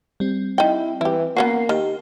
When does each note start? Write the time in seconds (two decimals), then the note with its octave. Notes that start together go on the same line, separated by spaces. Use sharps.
0.20 G3 C4
0.58 D#4 E4 G5
1.01 E3 E4 G4
1.37 A#3 B3 C#4 F#4 C7
1.69 D#3 G4